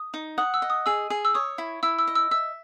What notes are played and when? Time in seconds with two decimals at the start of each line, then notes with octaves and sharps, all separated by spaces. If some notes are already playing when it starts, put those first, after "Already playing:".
Already playing: D#6
0.14 D#4
0.38 F#5 D#6
0.54 E6
0.62 D#5
0.70 D#6
0.86 G#4 E6
1.10 G#4
1.25 E6
1.34 C#5 D#6
1.58 E4
1.83 E4 E6
1.99 E6
2.07 D#5
2.15 E6
2.31 E5 E6